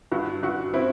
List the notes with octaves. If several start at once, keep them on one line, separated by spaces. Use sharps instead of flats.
G2 F#4
G2 F#4
C4 E4